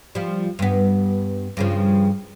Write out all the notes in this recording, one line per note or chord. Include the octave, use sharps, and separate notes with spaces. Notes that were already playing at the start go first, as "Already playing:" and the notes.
F3 G3
G2 B3
G2 C#3 F3